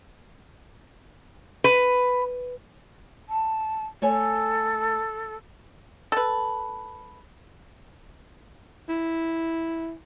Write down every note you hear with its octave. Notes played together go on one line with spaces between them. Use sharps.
B4
A5
A3 A4 C#5 G#5
A4 B4
E4